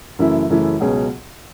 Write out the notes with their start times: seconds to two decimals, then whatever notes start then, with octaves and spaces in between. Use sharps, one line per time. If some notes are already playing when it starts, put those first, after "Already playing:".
0.19 F#2 C#3 E3 A3 E4
0.50 F#2 C#3 E3 A3 E4
0.80 C#2 B2 F#3 C#4 G#4